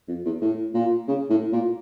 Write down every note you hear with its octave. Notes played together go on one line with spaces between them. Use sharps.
F2
E2
A2
A#2
C#3
A2
A#2